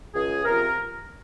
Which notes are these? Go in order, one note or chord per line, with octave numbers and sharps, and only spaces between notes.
C#2 G#4
C3 F3 A#4